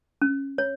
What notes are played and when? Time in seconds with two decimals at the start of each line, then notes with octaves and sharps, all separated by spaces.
0.22 C#4
0.58 C#5